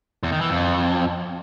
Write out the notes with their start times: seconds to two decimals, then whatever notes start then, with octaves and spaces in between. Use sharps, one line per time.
0.23 E2
0.32 D#3
0.41 E3
0.50 F2